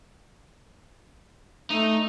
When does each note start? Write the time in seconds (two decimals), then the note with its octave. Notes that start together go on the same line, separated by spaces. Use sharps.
1.71 A3 D#4